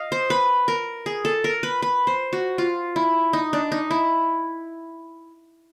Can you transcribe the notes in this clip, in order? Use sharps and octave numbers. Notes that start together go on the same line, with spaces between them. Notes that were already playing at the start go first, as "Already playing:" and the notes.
Already playing: D#5 F5
C5
B4
A#4
G#4
A4
A#4
B4
B4
C5
F#4
F4
E4
D#4
D4
D#4
E4